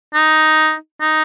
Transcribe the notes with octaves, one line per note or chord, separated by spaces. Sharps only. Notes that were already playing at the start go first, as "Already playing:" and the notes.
D#4
D#4